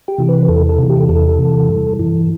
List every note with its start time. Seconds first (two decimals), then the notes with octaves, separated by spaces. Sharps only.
0.08 G4
0.18 C3 E3
0.29 B4
0.48 E2 A4
0.69 A4
0.78 C3 E3
0.89 G4
1.09 E2 A4
1.39 C3 E3
1.69 G2
1.99 E3